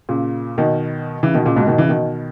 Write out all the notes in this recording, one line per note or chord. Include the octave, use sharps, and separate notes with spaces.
A#2 C#3
B2 D#3
C#3 E3
B2 D#3
A#2 C#3
G#2 B2
B2 D#3
C#3 E3
B2 D#3